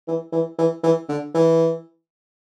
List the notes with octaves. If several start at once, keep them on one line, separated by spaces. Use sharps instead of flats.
E3
E3
E3
E3
D3
E3